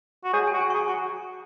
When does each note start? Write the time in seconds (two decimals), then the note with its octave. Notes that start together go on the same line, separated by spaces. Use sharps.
0.24 F#4
0.33 G#4 C#5
0.47 G#5
0.54 F#4
0.60 G#5
0.70 C#6
0.74 G#4 A#5
0.88 F#4 C#6